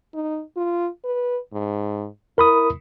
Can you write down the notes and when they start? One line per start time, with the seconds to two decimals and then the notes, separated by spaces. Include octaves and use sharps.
0.14 D#4
0.57 F4
1.04 B4
1.53 G#2
2.38 E4 A#4 B5 D#6